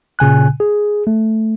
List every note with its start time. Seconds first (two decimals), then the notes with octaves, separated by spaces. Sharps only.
0.19 A#2 C#3 G#5 F#6
0.60 G#4
1.07 A3